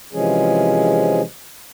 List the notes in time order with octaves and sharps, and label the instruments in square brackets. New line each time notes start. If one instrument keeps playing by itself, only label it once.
[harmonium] C3 E3 F3 G#3 C#4 G#4